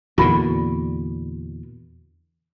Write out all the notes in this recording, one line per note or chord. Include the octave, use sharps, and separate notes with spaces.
E2 A#2 D3 F#4 B5